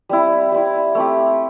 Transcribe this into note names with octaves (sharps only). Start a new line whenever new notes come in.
G3 C4 E4
G3 C4 E4
A3 C4 G4